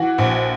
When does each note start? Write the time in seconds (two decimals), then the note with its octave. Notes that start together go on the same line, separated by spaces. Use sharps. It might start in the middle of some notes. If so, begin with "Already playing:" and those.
Already playing: E3 F#4
0.18 A#1